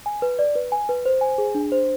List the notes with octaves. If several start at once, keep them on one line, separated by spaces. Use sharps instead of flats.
G#5
B4
D5
B4
G#5
B4
C5
G#5
G#4
D4
C5